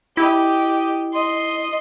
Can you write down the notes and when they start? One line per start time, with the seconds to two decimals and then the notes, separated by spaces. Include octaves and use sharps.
0.17 E4 G4 D#5
1.13 D#5 C6